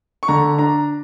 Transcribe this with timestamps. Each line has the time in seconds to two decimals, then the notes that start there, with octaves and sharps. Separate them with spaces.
0.23 C#6
0.28 D3 A#5
0.58 D4 A#5